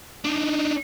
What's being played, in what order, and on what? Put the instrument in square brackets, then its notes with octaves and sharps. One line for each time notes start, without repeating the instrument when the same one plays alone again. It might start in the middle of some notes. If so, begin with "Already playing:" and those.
[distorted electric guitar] D4 D#4